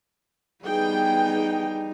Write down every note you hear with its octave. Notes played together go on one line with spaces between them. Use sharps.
G3 B3 D#4 G#4 G5